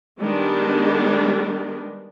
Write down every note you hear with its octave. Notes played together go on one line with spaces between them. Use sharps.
D#3 G3 G#3 B3 D4